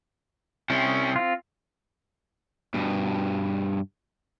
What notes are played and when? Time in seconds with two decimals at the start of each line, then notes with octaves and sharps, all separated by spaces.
0.70 C3 C#4 E4
1.16 C4 F4
2.74 G2 B2